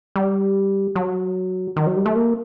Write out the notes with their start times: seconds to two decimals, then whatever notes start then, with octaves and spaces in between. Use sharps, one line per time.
0.16 G3
0.95 F#3
1.76 D#3
1.87 F#3
1.96 G3
2.06 A3
2.16 A#3